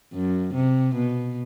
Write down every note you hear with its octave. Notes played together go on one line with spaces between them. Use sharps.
F#2
C3
B2